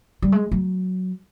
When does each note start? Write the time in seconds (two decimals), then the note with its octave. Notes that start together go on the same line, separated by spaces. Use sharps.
0.22 G3
0.32 G#3
0.52 F#3